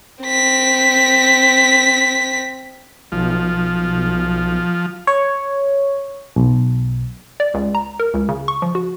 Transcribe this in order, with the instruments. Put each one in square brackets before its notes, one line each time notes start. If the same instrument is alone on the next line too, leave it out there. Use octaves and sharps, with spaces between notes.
[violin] C4 B6
[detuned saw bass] B1 [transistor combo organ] F3
[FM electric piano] C#5
B1
[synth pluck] D5
C#2
A#5
A#4
C#2
C#3
C#6
F3
F#4